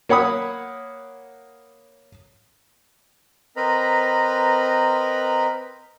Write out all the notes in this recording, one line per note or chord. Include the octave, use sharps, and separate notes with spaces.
A#3 C#5 F#5 B5 D#6
C4 A#4 B4 D#5 A#5 B5